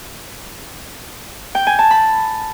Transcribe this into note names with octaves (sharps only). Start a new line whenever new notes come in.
G5
G#5
A5
B5